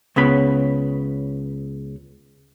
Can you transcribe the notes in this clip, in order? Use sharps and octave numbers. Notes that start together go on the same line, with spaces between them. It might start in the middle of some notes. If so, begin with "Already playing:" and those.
C#2 C#3 B3 B5